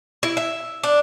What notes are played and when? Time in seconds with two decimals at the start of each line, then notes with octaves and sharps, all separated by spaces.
0.23 E4
0.37 E5
0.83 D4